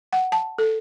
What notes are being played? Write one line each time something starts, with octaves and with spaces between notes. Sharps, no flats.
F#5
A5
A4